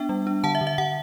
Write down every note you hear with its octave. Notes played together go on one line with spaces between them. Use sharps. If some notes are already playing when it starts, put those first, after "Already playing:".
Already playing: B3 D4 E5 G5
G3
D4
D3 F#5 A5
E5
D3
E5
D3 F#5